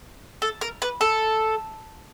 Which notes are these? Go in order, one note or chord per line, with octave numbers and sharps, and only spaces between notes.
A4
A#4
B4
A4